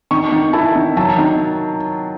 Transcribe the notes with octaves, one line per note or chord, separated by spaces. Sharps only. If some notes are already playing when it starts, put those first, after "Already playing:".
D#3 C#6
D#3
E4 A5
D#3
F#3 A5
D#3